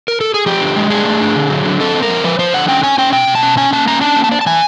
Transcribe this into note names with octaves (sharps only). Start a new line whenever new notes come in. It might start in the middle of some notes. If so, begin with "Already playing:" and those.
A#4
A4
G#4
F3 G4
D3
G#3
D4 G#4
A3
D4
D3
F#3
D3
C4 A4
C4
A#4
F3
F3 B4
F3 C5
D3 F#5
C#4 G5
C#4 G#5
C#4 G5
B2 G5
B2
A5
C#4
C#4 G#5
A#3 A5
C#4 A#5
D4 A5
A#3
A5
D4
A5
E3 G#5